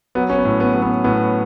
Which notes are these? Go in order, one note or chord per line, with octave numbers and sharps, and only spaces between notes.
F#3 B3
C#4
B3
A2
B3
F#3
B3
A2 B3